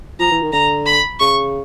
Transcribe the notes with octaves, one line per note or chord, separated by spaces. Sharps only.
F3 A#5
E3
D#3
D3 A#5
B5
C#3 C#6